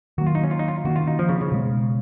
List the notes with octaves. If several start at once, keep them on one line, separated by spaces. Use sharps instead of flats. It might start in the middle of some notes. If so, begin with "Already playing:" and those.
D#3 F#3 A#3 F#4
F4
D#4
C#4
F4
D#4
F4
D#3 A#3 C#4 F#4
F4
D#4
F3
C#3
C#3
B2 G#3 B3